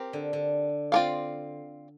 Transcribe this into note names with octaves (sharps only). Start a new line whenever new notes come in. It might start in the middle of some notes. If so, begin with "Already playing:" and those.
Already playing: C4 G4 A#4
D3
D3
C4 F4 A#4 D5 F5